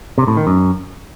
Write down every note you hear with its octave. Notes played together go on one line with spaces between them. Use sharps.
C3
A2
D#3
F#2